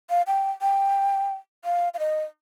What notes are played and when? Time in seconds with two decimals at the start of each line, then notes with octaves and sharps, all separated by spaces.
0.10 F5
0.27 G5
0.62 G5
1.65 F5
1.94 F5
1.99 D#5